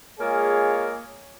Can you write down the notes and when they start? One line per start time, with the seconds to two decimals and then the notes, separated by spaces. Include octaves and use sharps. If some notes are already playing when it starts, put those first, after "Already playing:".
0.20 G#3 A#3 F4 G#4 C#5